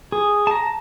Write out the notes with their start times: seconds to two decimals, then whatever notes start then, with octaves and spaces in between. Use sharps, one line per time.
0.12 G#4
0.47 A5 A#5